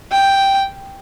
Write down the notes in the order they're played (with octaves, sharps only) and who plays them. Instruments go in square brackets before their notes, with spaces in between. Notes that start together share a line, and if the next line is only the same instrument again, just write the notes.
[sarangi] G5